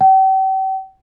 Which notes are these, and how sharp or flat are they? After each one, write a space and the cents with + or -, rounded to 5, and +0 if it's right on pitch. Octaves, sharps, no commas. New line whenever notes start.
G5 -40